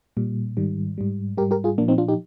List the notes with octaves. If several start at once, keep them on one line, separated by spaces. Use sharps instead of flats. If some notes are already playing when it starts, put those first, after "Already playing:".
A#2 G3
G#2 D#3 G3
G#2 G3
G#2 G3 G4 A#4
G4 A#4
F4 G#4
A#2 F3 A#3 D4
C4 D#4
D4 F4
D#4 G4